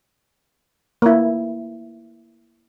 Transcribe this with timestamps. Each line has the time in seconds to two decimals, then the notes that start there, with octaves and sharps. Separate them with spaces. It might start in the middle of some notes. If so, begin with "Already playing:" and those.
1.02 A#3 E4